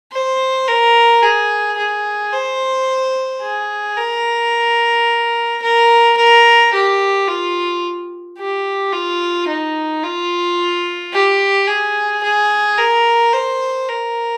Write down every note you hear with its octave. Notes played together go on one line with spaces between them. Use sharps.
C5
A#4
G#4
G#4
C5
G#4
A#4
A#4
A#4
G4
F4
G4
F4
D#4
F4
G4
G#4
G#4
A#4
C5
A#4